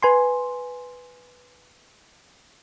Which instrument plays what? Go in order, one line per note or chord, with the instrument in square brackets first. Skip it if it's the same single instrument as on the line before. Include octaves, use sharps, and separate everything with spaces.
[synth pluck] B4 G#5 C6